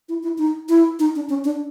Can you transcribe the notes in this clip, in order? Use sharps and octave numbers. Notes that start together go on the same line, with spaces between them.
E4
E4
D#4
E4
D#4
D4
C#4
D4